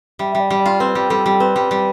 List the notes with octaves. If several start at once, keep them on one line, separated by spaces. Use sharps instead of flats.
G3 E5
G3 E5
D5
G3
D5
F4
C4 B4
G3
G3 A4
G3
C4 B4
G3
G3